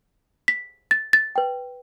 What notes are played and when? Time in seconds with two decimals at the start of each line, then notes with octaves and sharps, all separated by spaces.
0.48 B6
0.91 A6
1.13 A6
1.36 B4 G5